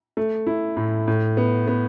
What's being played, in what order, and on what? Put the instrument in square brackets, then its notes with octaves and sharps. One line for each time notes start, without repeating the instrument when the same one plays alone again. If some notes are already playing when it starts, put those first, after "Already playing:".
[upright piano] A3
E4
A2
A2
B3
B3